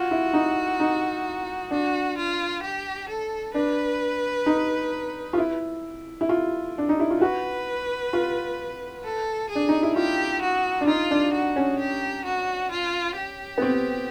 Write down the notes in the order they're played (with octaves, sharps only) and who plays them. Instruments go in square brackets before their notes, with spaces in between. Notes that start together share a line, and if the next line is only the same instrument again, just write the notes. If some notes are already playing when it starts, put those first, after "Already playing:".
Already playing: [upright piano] F4 [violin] F#4
[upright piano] E4
D#4
D#4
[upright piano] D4 [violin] F#4
[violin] F4
G4
A4
[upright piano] D4 [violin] B4
[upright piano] D#4
F4
E4
E4
F4
D4
D#4
E4
F4
[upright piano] F#4 [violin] B4
[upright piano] F4
[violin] A4
G#4
[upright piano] D4
D#4
E4
[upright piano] F4 [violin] G4
[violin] F#4
[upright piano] D4
[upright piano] D#4 [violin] F4
[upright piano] D4
[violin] F#4
[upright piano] C#4
[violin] G4
F#4
F4
G4
[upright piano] B3
C4